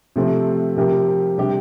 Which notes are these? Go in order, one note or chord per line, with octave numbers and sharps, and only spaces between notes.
C3 F3 A3 C4
C3 F3 C4 G4 A#4
C3 G3 D4 G4